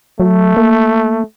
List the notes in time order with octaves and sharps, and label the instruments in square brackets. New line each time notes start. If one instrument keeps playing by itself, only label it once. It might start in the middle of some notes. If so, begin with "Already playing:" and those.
[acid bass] F#3 [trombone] A3
[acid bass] A#3